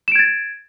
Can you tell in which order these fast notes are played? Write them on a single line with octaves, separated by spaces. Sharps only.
E7 D7 G#6 A6